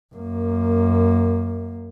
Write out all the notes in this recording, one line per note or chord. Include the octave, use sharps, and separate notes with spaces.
F#2 A#3